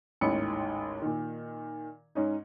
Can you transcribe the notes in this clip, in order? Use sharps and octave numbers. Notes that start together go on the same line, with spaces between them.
A1 D#2 G#2 C#4 B5 C#7
A#2 D#3
G#2 C#4 D#4